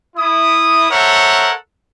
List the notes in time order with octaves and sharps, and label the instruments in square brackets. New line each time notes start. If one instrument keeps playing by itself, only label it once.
[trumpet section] E4 D#6
A4 A#4 C5 C#5 E5 F#5